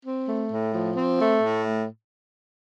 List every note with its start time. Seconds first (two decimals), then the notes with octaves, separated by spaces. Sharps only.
0.04 C4
0.27 A3
0.49 A2
0.73 F3
0.95 C4
1.18 A3
1.41 A2